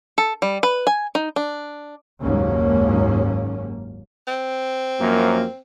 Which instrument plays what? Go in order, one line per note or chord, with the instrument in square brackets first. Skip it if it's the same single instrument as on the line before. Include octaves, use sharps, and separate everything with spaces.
[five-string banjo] A4
G3
B4
G#5
D#4
D4
[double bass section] F#1 D#2 G#2 A#3 C#4
[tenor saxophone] C4
[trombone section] F#2 F3 A#3